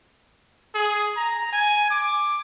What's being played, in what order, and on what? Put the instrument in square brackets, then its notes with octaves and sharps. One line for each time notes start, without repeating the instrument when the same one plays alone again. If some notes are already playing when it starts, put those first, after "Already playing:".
[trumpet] G#4
A#5
G#5
D6